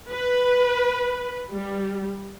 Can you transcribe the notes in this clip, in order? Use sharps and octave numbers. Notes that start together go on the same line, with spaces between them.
B4
G3